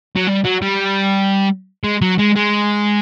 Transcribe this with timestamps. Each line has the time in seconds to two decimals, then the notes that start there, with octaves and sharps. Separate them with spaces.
0.16 F#3
0.27 G3
0.45 F#3
0.62 G3
1.84 G#3
2.02 F#3
2.18 G#3
2.36 G#3